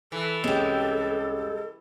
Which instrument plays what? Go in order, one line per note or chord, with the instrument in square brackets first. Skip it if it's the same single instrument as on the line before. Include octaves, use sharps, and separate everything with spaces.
[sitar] E3 [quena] A4
[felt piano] C2 C#4 E7 [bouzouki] G#3 G4